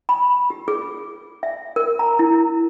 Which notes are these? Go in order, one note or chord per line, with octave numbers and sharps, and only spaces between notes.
B5
G4
G#4
E5
A#4
A#5
E4